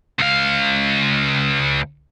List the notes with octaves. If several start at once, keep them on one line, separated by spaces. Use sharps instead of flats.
C#2 F5